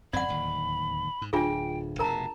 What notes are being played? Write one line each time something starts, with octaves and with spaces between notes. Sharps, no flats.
G#1 F#2 C4 D5 F#5 B5
D1 D#2
G#2
D1 D4 F4 G#4 G5
F1 B2 A#4 A5 A#5